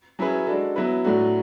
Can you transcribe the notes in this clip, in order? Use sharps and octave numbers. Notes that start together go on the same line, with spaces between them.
F#3 C#4 E4 G#4 B4
G#3 D4 F#4 A4
F#3 B3 E4 B4
A2 F#3 A3 D4 F#4